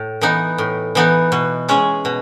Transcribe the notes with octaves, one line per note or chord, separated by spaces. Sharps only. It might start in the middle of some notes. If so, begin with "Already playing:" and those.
Already playing: A2
E3 B3 D#4
A2
E3 B3 D#4
B2
G#3 C#4 G#4
B2